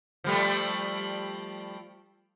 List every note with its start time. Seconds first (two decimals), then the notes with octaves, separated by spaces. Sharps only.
0.24 F3 G3 A3